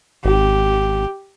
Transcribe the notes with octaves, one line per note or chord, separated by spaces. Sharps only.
G#1 G4